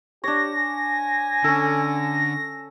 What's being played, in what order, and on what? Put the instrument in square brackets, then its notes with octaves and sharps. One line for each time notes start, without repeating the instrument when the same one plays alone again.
[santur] D4 C#5 [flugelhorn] G4 [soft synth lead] A#6
[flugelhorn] G#5
[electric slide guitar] D3 [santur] C#4 A4